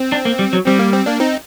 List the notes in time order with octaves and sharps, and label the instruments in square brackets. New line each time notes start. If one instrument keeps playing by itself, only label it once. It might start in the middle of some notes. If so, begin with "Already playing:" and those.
Already playing: [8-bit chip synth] C4
[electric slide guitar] D4
A#3
G3
F#3
[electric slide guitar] G3 [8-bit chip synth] C4
[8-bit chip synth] A#3
C4
A#3 D4
C4 D#4